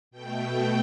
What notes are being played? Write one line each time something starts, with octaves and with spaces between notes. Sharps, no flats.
B2 A3 G5